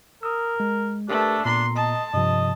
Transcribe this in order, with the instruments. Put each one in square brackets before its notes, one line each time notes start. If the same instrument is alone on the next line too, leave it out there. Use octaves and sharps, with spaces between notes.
[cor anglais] A#4 [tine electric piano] D#6 E6
[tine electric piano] G#3
[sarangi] A3 [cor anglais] D4 [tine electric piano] G4 A#4 B4
[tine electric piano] A#2 B3 A#5 [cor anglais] D4 [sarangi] C6
[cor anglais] D#5 [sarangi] A5
[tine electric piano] G2 C3 F3 [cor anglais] D#5